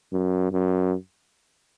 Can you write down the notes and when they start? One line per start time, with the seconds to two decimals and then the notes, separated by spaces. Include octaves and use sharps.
0.12 F#2
0.52 F#2